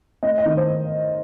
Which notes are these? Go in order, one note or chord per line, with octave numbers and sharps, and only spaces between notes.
A3 D#5
D#5
D#3
C5